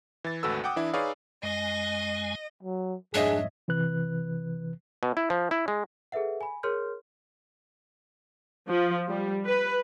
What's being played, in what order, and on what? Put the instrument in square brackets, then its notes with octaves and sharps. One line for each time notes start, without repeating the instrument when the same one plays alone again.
[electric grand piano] E3 A6
G#1 D2 F#4 A4 B4 E6
F#5 G5 D6 D#6
E3 D4 E4
D#4 G#4 B4 C#5 D5 F5
[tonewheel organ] F#2 G#3 G#5 [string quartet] D#5
[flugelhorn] F#3
[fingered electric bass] F2 G#2 [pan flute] D4 [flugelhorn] G#4 [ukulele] C#5 D#5 E5
[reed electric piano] C3 E3 B4 F#6
[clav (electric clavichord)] B2
E4
F3
E4
G#3
[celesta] G#4 A4 B4 E5 F#5
G#5 B5
G#4 A#4 C#5 C6 F6 G6
[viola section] F3
G3
B4